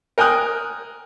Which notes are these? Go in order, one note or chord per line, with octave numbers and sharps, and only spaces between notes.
A#4 G5 G#5 D#6 F#6